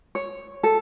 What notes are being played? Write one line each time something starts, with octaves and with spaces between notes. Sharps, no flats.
C#5
A4